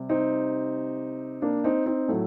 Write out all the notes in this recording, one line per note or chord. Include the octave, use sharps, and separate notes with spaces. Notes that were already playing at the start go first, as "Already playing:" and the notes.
Already playing: C3 G3
C4 D#4
A#3 D4
C4 D#4
C4 D#4
A2 F#3 A3